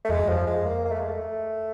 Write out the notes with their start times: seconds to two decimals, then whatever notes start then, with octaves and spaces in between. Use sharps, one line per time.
0.05 A3
0.09 F2 G#3
0.19 F#2
0.27 F2 F3
0.47 G#3
0.66 A#3
0.84 A#3
0.91 A3
0.99 G#3
1.08 A3